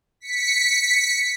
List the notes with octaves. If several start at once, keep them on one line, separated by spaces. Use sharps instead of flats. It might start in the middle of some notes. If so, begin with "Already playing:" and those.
B6 C#7